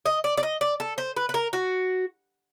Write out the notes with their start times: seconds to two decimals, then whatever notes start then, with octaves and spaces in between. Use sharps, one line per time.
0.06 D#5
0.24 D5
0.37 D5
0.43 D#5
0.61 D5
0.80 A4
0.98 C5
1.17 B4
1.29 B4
1.34 A#4
1.53 F#4